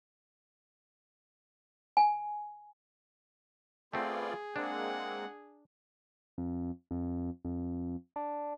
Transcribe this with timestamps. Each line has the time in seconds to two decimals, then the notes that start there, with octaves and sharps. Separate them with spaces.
1.97 G#5
3.93 A3 B3 C4 F4 G#4 D5
4.56 G#3 A#3 C4 D4 F#5
6.38 F2
6.91 F2
7.45 F2
8.16 D4